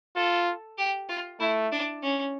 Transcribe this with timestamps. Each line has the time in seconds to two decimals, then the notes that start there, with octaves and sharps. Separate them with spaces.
0.16 F4 A4
0.78 G4
1.09 F4
1.40 A3 E4
1.72 D4
2.02 C#4